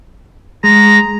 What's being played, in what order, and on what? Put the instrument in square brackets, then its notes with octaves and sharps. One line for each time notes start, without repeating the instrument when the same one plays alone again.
[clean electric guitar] G#3 [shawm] A#5